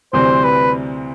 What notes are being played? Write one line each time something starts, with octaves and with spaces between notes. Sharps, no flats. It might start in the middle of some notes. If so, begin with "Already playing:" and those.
D2 C3 E3 G3 C4 C5
B4